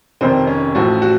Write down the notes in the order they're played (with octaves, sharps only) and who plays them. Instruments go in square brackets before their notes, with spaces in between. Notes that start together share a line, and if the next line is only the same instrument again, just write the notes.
[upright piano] F1 F2 D#3 C4
C#4
A1 A2 F3 F#4
F#4